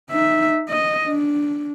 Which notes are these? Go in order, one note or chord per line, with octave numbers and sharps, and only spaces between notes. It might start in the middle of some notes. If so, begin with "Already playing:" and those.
D#4 E5
D#5
D4